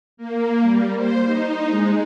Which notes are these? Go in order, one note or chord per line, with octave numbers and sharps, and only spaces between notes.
A#3
G3
C5
D#4
G#3